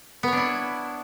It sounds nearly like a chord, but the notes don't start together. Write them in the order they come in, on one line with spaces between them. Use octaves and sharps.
B3 C#5 D4 E4